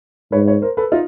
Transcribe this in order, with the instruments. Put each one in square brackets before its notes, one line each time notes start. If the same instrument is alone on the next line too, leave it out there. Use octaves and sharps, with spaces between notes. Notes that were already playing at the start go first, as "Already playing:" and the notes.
[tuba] G#2 [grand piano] B4 C#5
[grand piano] B4 C#5
A#4 C5
A4 B4
D#4 F4